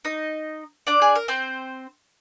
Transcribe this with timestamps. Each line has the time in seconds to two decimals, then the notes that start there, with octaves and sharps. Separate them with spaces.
0.05 D#4 D#5
0.87 D4 D5
1.02 G#4
1.15 A#4
1.28 C4 C5